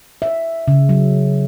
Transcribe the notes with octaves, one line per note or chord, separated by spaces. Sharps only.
E5
C#3
F#3